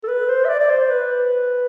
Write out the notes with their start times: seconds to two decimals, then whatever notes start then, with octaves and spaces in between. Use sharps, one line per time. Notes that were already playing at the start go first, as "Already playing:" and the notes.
0.04 A4
0.08 B4
0.29 C5
0.45 E5
0.49 D5
0.60 D5
0.70 C5
0.90 B4